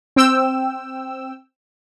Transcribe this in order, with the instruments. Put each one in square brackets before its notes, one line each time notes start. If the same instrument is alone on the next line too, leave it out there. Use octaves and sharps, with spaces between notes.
[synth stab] C4 G5 E6